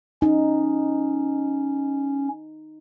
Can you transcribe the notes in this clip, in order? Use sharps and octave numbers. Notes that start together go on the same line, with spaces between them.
C#4 D#4